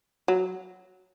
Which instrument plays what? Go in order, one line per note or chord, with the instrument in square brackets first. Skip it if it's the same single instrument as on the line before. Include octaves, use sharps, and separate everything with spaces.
[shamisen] F#3